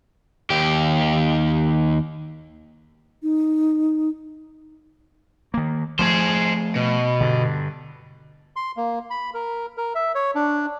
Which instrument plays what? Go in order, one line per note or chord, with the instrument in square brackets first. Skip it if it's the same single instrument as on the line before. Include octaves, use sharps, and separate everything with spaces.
[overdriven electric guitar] D#2 G4
[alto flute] D#4
[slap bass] D#3 A#3
[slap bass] F3 A3 [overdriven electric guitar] G#4 C5
[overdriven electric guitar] B2
[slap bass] G2 D3
[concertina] C6
A#3
B5
A#4
A#4
E5
C#5
D4